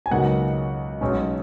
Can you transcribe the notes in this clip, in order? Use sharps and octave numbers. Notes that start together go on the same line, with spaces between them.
G#5
C#2 B2 F#3 A#3 D#4 F#5
B1 B2 G#3 C#4